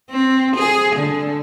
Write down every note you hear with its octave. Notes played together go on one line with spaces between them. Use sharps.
C4
G#4
D3